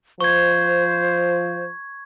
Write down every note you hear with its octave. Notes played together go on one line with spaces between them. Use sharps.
F3 C5 C#6 G#6